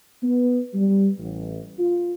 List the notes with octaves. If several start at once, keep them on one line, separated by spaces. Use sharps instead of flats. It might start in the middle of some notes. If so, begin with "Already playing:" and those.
B3
G3
A1
F4